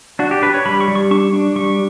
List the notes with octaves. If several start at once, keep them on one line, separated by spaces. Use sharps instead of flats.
D4 F#4
G4
D4 B4
C#5
G3 B5
C#6
G3
C#6
D4 C#6
D4
G3 C#6